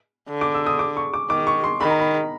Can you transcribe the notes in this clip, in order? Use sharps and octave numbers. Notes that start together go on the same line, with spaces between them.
D3
D6
E6
D#6
D6
C#6
D6
D#3 D6
C#6
C6
D#3 B5
A#5
B5